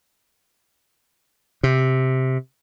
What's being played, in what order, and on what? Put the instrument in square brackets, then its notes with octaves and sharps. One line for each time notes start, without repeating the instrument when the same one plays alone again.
[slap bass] C3